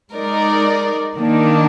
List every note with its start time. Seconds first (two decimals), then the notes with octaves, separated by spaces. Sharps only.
0.12 G#3 D#4 A#4 D5
1.17 D#3 A#3 D4